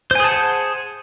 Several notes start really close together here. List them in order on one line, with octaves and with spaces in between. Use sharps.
C5 G#5 G#4 A5 F#5